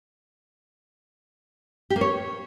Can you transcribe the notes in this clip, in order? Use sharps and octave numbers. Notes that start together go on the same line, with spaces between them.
G4
A#3
C#5